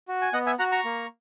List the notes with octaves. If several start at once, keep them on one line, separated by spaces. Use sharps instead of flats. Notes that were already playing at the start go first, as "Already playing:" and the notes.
F#4
G#5
B3 D#5 F#5
E5 G#5
F#4 F#5 A#5
A#5 C#6
A#3